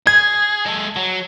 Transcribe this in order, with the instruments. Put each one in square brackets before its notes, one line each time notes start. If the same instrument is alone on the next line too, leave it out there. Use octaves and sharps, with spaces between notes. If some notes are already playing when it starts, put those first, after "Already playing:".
[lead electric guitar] G#4 [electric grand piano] G#6
[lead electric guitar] G#3 A4
F#3